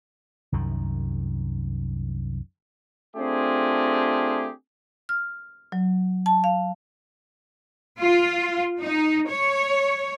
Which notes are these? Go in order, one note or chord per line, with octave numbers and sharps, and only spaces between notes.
C2 F#2 D#3
A3 C4 D4 F4 G4 G#4
F6
F#3
A5
F5
F4
D#4
C#5